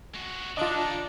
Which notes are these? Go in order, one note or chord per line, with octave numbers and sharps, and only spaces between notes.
G#3 F#4
D3 D4 D#4 F4 D#5